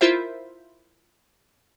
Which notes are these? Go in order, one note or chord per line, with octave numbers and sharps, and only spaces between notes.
E4 F4 A#4 C5 E5